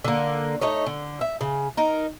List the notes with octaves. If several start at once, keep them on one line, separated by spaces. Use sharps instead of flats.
D3 A#3
A3 D#4 C#5
D3
E5
C#3
D#4 A#4